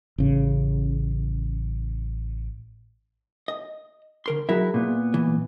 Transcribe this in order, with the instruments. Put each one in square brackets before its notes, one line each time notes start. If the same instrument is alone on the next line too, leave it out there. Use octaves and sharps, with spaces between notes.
[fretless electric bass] A1 C#3
[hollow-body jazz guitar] D#5
D3 A#4 C6
[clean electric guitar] F#3 E4 [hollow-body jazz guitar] G#4 A#4 E5
[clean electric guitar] A#2 B3
[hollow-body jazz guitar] B1 E3